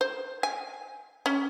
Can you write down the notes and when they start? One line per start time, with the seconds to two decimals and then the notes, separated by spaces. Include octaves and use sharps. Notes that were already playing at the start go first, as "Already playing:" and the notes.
0.01 C5
0.43 G#5
1.26 C#4